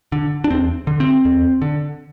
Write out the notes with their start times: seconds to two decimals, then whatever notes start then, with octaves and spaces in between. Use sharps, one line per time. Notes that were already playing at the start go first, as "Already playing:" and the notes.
0.12 D3
0.44 D4
0.50 E2 C4
0.87 D3
1.00 C4
1.25 E2
1.62 D3